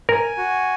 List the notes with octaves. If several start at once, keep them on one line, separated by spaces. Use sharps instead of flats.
A#4 G#5
F#4